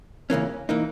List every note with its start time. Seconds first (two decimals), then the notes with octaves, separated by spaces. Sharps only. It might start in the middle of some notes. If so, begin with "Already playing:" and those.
0.30 C#2 C#3 E3 A#3 C#4
0.69 E3 A#3 D#4